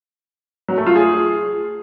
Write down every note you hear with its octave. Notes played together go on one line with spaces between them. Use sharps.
F#3
A3
F4
G#4